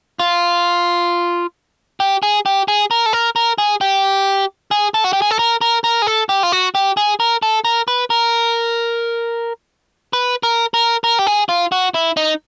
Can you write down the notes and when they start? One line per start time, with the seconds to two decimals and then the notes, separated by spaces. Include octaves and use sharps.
0.20 F4
2.00 G4
2.23 G#4
2.46 G4
2.68 G#4
2.91 A#4
3.06 A4
3.13 A#4
3.36 A#4
3.58 G#4
3.81 G4
4.71 G#4
4.94 A4
5.04 F#4
5.13 G4
5.22 G#4
5.31 A4
5.39 A#4
5.61 A#4
5.84 A#4
6.02 G#4
6.07 A4
6.29 G4
6.43 F4
6.52 F#4
6.75 G4
6.97 G#4
7.20 A#4
7.43 A4
7.65 A#4
7.88 B4
8.10 A#4
10.13 B4
10.43 A#4
10.74 A#4
11.04 A#4
11.19 G4
11.27 G#4
11.49 F4
11.72 F#4
11.94 E4
12.17 D#4